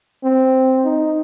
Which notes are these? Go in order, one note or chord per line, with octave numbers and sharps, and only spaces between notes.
C4
D#4